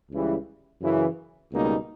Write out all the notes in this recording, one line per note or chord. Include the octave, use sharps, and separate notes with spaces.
C#2 C#3 E3 G3
F#2 C#3 E3
C#2 B2 G3 A#3 D#4